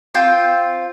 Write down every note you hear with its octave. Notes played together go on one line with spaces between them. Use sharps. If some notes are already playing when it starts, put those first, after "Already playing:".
C4 F4 G5